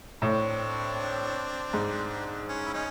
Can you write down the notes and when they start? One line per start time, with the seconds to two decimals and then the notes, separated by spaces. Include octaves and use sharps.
0.21 A2 C4 D4
1.73 G#2
2.49 C#4
2.65 E4
2.73 C#4 D#4